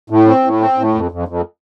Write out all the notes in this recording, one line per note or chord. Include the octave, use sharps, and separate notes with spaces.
A2
C4
A2
C4
A2
F2
F2
F2